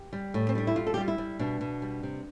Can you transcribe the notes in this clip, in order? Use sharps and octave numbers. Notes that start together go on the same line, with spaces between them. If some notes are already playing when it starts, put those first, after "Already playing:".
Already playing: G4
G3
A2
C4
G3 D4
E4
G3 F4
A4
G4
G3 F4
E4
G3
B2 D4
B2
G3
C3